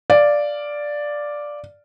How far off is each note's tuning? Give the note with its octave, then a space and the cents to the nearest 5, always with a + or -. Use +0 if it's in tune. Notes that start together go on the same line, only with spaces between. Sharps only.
D5 +0 F5 -5